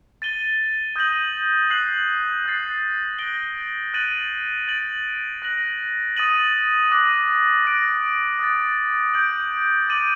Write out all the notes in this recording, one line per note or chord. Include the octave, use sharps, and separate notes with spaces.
A6 D#7 G7
D#6 G6 A#6 D#7 F#7
F#6 C7 F#7
D#6 F#6 A6 C7
F#6 A#6 D7 G7
F#6 A6 D#7 F#7
A6 D7 F#7
F#6 A#6 F#7
D#6 A6 D#7 F#7
D6 F#6 A#6 D#7
F#6 A#6 D7
D#6 F#6 A6
G6 D7 F#7
D6 A6 D#7 F#7